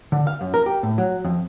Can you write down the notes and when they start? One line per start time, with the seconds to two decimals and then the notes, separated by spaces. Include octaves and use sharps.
0.12 D3
0.27 F5
0.41 F#2
0.54 A#4
0.66 G4
0.83 A2
0.98 F#3
1.25 F2